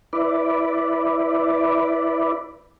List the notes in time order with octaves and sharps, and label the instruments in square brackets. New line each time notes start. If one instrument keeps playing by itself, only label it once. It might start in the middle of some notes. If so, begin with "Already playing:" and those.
[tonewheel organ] E4 B4 D5